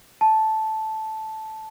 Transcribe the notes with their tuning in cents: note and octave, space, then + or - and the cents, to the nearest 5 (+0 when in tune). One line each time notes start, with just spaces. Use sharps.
A5 -10